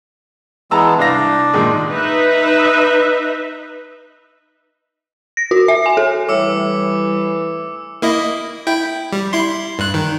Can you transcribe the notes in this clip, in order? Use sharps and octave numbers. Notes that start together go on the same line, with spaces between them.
E3 G#3 B3 A5 A#5 E6
C2 D4 F5 A#6
A#2 D#3 G#3
D#4 B4 E5
A#6
F#4
E5
G#5
A4
A2 E3 G3 D6 E6 C#7
A#3 E4 D#5
E4 G5
G3
E4 C6
G2 F#6
D#3